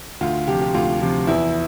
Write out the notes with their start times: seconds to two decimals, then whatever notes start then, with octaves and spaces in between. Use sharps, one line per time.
0.21 D2 F4
0.48 C3 F3 G4
0.61 G4
0.74 D2 F4
1.00 C3 F3
1.27 E2 E4